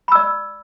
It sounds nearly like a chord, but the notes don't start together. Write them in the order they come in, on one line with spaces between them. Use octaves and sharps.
B5 E6 D5